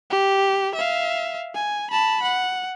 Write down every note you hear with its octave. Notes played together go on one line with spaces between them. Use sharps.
G4
E5 F5
G#5
A5 B5
F#5